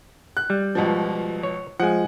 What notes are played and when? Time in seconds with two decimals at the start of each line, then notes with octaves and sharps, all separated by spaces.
0.37 F#6
0.50 G3
0.75 C#2 B2 F3
1.43 C#5
1.80 F3 G#3 F#5 G#5